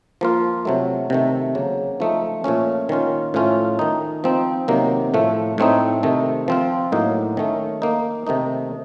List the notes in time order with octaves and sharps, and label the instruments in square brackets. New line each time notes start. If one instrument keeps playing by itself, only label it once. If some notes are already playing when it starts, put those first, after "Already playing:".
[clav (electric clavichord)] F3 A#3 F4
C3 F#3 A3
C3 D#3 A3
C#3 F#3 A#3
F3 A3 D#4
A#2 F3 A3 C#4
D#3 A#3 C#4 F4
A2 F3 A3 C#4 F4
D#3 A3 D#4
F3 C4 D#4
C3 D#3 F#3 A#3
A2 F3 A3
A2 A3 C4 D#4
C3 D#3 A3
F3 C4 F4
A2 F#3 A#3 D#4
D#3 A3 C#4
D#3 A#3 D#4
C3 D#3 A3 D#4